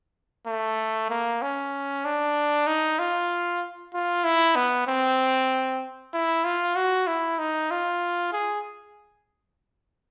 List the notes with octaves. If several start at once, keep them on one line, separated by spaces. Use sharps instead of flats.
A3
A#3
C#4
D4
D#4
F4
F4
E4
B3
C4
E4
F4
F#4
E4
D#4
F4
G#4